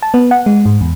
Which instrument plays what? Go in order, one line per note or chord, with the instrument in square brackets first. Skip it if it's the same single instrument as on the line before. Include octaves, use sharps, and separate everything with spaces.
[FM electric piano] A5
B3
F#5
G#3
G#2
E2